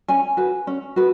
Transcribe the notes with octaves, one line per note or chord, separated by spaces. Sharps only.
C#4 G#5
F#4 B4
C#4
F#4 B4